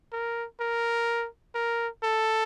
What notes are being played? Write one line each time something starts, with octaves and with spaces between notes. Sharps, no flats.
A#4
A#4
A#4
A4